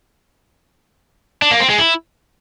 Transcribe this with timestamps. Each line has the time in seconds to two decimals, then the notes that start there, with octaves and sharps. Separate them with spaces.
1.42 D4
1.51 A#3
1.60 C4
1.69 G#3
1.78 E4